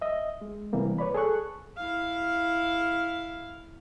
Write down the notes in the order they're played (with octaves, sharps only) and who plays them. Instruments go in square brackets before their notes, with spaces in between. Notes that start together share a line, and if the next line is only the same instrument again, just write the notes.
[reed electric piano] D#5 E5
G#3
C3 E3 G3 A#3 B3
B4 C#5 D5 B5
G#4 A4 G#5 C#6 F#6
[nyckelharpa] E4 F5